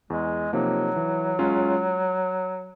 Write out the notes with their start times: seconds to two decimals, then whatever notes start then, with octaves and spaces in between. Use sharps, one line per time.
0.10 E2 G#3
0.53 C3 F3 F#3 A#3 D#4
0.96 E3
1.39 G#3 C#4 F4